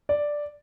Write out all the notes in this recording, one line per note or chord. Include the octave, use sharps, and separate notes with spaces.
D5